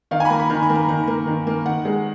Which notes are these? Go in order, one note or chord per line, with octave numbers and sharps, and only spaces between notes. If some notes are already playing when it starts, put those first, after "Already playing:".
D#3 F5
G#5
B5
A#3 A#5
B5
D#3 A#5
B5
A#3
A#5
D#3 A#5
A#3
D#3
A#3
D#3 F#5
G#3